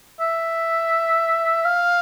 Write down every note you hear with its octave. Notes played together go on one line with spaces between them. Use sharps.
E5
F5